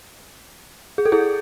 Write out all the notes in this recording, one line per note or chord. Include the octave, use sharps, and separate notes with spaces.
G#4
A4
E4 G#4